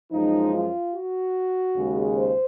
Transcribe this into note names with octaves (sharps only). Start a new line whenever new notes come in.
F#2 F3 G#3 D#4
F4
F#4
D#2 C#3 G#3
C5